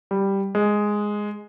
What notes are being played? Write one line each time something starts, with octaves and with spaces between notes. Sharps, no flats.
G3
G#3